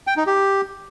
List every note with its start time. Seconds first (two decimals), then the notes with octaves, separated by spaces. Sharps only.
0.07 G5
0.17 D#4
0.27 G4